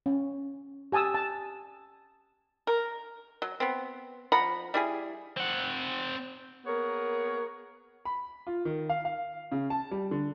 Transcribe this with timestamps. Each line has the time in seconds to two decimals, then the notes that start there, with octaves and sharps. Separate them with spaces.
0.06 C#4
0.92 G4 G#5 A5 D#6 E6
1.14 A5
2.67 A#4
3.42 F#3
3.60 B3 C4
4.32 F3 F#5 A#5 B5
4.74 G3 E4 G#4
5.37 C4 F#5
6.66 A#3 B3 G#4 A#4 C#5
8.05 B5
8.47 F4
8.65 D#3
8.89 F5
9.05 F5
9.52 C#3
9.70 A5
9.91 G3
10.11 D3